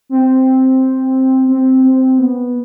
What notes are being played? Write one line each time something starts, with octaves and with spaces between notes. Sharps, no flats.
C4
C4
C4
B3